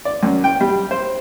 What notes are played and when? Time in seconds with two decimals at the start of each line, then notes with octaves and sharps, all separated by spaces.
0.05 D5
0.23 F#2
0.44 G5
0.61 G3
0.91 C5